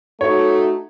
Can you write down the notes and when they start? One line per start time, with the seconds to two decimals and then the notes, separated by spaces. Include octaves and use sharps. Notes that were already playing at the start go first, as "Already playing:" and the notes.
0.21 A3 D#4 F#4 A4 C#5